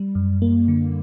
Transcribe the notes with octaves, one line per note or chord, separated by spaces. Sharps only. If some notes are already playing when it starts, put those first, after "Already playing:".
Already playing: G3
F#2
A#3
D3